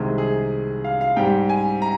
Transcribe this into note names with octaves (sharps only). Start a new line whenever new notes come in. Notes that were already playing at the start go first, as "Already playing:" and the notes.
Already playing: C2 C3 D#3 G#3
G#4
F5
F5
G#2 G3 G5
G#5
A#5